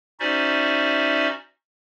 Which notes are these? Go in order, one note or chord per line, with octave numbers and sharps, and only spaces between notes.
C#4 D#4 F#4 C5 D5 E5